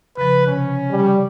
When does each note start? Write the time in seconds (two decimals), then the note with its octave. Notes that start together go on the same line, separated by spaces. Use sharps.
0.17 C#3 F3 B4
0.47 C3 C#4
0.90 G3